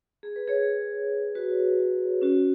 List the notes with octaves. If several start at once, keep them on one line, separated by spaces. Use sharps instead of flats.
G#4
B4
G#4 C#5
F#4 B4
C#4 F#4